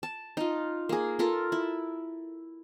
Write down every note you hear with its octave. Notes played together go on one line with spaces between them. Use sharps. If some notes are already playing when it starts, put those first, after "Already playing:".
A5
D#4 F4
A#3 G#4
F4 A4 A#4
E4